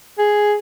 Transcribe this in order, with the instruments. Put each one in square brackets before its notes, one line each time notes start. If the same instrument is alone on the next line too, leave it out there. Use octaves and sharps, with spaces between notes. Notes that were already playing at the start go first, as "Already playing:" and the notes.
[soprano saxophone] G#4